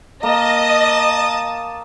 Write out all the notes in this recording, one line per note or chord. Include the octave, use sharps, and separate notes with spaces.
A#3 D#5 A5 D#6